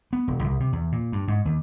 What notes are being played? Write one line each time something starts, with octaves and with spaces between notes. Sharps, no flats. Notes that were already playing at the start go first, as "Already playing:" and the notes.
B3
E1
C2
C3
E2
A#2
G2
G#2
D#2